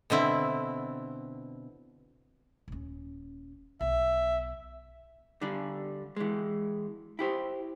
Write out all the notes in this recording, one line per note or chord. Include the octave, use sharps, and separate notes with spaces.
B2 D3 C4 E4
D#1 C#4
B1 E5
D3 G3 D4
E3 G#3
E4 G4 C5